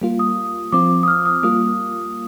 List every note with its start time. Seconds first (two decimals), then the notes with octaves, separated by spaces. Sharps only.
0.01 G3 A#3 F4
0.19 D#6
0.72 F3 C4 F4 D6
1.03 D#6
1.08 F6
1.25 D#6
1.43 G3 A#3 F4 D#6